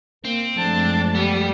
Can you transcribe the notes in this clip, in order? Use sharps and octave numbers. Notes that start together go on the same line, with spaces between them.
A#3 C4
F#2 F3 G#3 A3 D4 A5
G3 B3